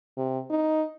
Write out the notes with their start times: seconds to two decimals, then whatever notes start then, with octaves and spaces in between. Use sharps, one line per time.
0.17 C3
0.50 D#4